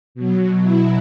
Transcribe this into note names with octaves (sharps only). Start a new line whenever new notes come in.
B2 F#3
E4